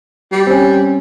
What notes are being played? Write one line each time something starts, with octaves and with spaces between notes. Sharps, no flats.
G3
C4 C#4